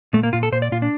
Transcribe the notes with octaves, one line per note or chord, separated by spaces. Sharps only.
A#2 A3
A#3
A#2 F4
A4
A#2 C5
D5
A#2 F4
D4